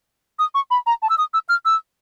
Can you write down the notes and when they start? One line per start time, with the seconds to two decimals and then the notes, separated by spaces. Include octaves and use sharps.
0.39 D#6
0.54 C#6
0.71 B5
0.86 A#5
1.02 A5
1.10 E6
1.18 D#6
1.34 E6
1.49 F6
1.65 E6